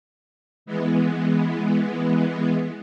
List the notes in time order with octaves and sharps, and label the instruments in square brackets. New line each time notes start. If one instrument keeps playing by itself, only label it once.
[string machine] E3 G#3 B3